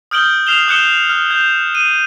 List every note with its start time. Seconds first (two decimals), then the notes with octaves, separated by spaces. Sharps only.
0.11 D#6 F6 G6 D7 F#7 G7
0.47 F6 C7 E7 F7 G7
0.68 D#6 F#6 G6 C#7 E7 G7
1.10 F6
1.31 G6
1.75 D#7